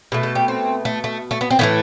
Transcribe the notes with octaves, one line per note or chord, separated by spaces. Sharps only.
B2 A3
A4
G4
C4
A3
A3
A3
B3
C4
A2 E3 A3 B3